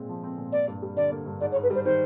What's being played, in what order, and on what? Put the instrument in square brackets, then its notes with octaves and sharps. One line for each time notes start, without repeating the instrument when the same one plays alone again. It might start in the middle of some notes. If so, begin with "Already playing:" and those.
Already playing: [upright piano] A#2 G#3 C4
F3
C4
A#2
[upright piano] A#3 [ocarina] D5
[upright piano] G2
G3
[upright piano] D3 [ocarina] D5
[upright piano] A#3
G2
[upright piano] G#2 [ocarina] D5
[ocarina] C#5
[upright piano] G#2
[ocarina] B4
[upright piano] G3 [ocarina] C5
[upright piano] D#3 [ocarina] C5